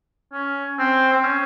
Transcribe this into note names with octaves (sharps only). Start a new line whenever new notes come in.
C#4
C4
C4
C#4